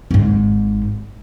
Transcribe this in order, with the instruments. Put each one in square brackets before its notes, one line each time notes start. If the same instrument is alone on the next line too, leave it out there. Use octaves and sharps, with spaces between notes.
[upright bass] G#1 G#2